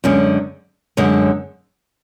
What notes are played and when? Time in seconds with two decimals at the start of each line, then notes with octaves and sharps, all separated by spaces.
0.04 F#2 D3 G#3 C#4
0.97 F#2 D3 G#3 C#4